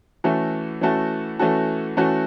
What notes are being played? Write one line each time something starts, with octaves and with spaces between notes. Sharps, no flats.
E3 A3 C#4 F#4 A4
E3 A3 C#4 F#4 A4
E3 A3 C#4 F#4 A4
E3 A3 C#4 F#4 A4